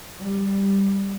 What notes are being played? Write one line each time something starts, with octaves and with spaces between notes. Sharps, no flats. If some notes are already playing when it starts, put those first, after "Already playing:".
G3